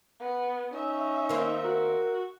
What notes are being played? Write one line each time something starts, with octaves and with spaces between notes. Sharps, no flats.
B3
C#4 D#4 E5
D#3 A#3 C4
F#4 A#4